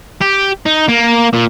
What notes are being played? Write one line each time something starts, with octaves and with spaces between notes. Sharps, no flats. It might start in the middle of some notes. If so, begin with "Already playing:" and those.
G4
D#4
A#3
A#2